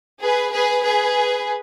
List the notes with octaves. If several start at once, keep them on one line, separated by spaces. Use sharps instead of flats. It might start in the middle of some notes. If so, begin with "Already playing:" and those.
G#4 B4
G#4 B4
G#4 B4